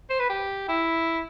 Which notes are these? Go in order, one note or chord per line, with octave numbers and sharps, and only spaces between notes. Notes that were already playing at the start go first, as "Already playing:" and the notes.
C5
B4
G4
E4